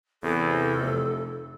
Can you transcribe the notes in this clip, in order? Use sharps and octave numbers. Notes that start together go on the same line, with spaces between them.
E2 C3 A4
F1